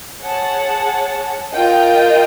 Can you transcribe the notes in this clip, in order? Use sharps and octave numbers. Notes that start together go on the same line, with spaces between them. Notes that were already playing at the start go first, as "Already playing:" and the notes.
G#4 C#5 F#5 A5
F4 A#4 D#5 G5